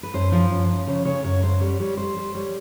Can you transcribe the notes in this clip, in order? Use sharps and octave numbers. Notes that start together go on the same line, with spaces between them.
B4
F#2 C5
F3 C5
F#2
F#2
C#3 C#5
C#3 C#5
F#2 C#5
F#2 C5
G3 C#5
G3 C#5
G3 C5
G3
G3 C#5